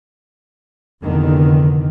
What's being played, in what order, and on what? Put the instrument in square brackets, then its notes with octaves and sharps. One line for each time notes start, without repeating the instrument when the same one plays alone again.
[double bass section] F1 E2 D3 D#3